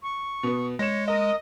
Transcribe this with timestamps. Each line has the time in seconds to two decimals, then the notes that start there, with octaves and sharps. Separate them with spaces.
0.03 C#6
0.43 B2 B3
0.79 G#3 C#5 A#6 E7
1.08 A#4 D#5 D#6